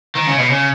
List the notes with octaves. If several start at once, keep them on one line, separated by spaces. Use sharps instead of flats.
D#3
C#3
B2
C#3